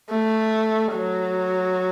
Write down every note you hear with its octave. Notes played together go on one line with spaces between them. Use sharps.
A3
F#3